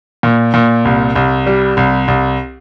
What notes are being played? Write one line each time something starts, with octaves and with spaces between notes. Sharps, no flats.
A#2
A#2
C2
C2
G3
C2
C2